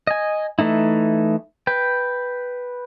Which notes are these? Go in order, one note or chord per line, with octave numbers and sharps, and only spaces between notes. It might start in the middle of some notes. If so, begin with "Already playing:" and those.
D#5 G#5
E3 A3 D#4 E4
B4 G5